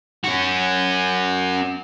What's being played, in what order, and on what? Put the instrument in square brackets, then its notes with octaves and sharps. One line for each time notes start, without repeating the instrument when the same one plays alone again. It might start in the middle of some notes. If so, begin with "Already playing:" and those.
[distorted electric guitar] C#4 F#4